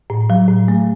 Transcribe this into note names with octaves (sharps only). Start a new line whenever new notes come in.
A2
F#3
A2
A3